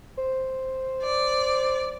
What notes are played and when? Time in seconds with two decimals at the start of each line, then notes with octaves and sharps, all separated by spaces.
0.18 C5
1.04 D5